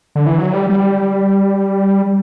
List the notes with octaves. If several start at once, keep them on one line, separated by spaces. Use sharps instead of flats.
D3
E3
F#3
G3
G3